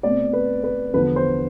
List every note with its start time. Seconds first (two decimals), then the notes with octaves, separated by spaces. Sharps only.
0.03 B2 A3 C4 D5
0.33 B4
0.64 B4
0.94 E2 D3 F3 B4
1.16 C5